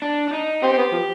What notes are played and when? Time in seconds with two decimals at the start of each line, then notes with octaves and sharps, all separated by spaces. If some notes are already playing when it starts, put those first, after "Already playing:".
0.02 D4
0.28 D4
0.33 D#4
0.62 C4 G4
0.72 C4
0.78 B3
0.92 F3